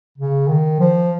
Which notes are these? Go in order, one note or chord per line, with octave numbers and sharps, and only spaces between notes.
C#3
D#3
F3